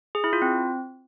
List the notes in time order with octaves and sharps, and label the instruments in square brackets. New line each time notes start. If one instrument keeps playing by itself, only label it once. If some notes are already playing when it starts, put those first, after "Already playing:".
[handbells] G#4
E4
F4
C4